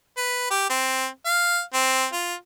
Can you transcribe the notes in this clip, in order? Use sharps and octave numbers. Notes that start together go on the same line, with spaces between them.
B4
G4
C4
F5
C4
F4